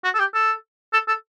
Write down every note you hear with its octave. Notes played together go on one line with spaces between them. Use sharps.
F#4
A4
G4
A4
A4
A4